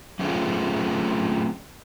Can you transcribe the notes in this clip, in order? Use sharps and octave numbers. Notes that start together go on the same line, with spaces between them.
F#3 A3 C4 C#4 F4 G#4